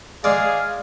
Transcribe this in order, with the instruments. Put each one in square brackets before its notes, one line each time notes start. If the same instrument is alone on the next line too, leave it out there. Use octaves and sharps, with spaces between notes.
[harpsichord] G#3 D5 [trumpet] G#4 [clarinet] F5